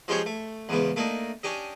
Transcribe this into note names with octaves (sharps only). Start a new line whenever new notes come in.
F3 G#3 C#4 G4 C5 C#5
A3
E2 G#2 C#3 B3
A3 A#3 D4 D#4
C#4 D4 G4 D#5